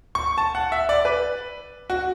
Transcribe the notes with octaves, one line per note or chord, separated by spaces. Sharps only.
C#6
A5
F#5
E5
D5
B4
F#4